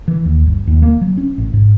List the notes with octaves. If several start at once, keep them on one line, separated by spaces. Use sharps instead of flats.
E3
D#2
G1
D#2
A#3
F#3
C#4
A1
G#2